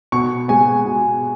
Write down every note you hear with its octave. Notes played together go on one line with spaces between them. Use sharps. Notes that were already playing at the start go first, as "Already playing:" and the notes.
B2 C#6
G#3 B3 G#5
B2